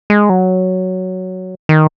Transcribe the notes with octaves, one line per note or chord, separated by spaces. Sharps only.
G#3
F#3
D#3